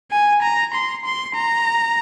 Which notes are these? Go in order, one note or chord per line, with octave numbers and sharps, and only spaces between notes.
G#5
A#5
C6
C6
A#5